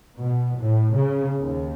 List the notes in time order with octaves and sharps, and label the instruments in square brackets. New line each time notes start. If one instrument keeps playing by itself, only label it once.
[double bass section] B2
A2
C#3
D#2